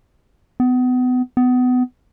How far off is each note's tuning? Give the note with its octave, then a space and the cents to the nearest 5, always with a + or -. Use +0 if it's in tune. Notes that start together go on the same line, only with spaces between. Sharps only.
B3 +30
B3 +25